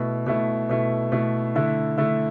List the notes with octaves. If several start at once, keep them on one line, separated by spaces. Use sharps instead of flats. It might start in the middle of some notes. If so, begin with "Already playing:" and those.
Already playing: B2 A3 E4
B2 A3 E4
B2 A3 E4
B2 A3 E4
D3 A3 E4
D3 A3 E4